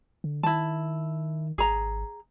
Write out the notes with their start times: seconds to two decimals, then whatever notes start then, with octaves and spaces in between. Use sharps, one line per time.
0.24 D3
0.43 D#3 E4 A5
1.58 G#1 G#4 A#5